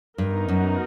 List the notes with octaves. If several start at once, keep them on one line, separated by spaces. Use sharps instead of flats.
G2 B3 D#4 F#4 A#4
F#2